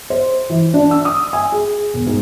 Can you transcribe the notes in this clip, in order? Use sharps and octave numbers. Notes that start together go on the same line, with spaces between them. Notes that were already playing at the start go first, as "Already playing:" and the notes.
C5
E3
D4
E6
D#6
G#5
G#4
E1
G#2